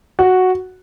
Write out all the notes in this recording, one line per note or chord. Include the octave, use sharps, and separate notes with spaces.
F#4